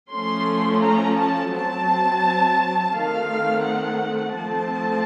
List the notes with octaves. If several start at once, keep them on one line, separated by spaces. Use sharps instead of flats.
F3 A3 C#4 C6
A#5
A5
F#3 C4 A5
D#3 A3 C4 F5
F#5
F3 A3 C4 A5